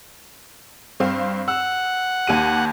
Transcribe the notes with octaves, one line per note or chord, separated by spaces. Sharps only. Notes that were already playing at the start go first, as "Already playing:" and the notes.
G2 C4 F5
F#5 E6
D#2 G4 D#7